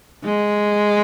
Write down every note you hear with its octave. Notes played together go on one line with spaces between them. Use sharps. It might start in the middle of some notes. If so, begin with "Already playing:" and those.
G#3